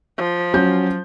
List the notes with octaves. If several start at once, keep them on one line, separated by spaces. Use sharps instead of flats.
F3
F#3 C#4 G6